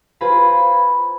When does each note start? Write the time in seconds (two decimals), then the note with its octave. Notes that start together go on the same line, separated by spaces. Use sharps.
0.21 F4 G#4 B4 C5 A#5 B5